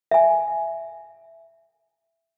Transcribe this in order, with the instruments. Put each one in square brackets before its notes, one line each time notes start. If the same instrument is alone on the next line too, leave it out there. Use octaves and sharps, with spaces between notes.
[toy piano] E5 G#5